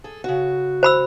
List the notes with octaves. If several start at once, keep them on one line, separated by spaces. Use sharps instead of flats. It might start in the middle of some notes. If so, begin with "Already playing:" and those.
G#4 A4
C#3 F#4
C5 B5 E6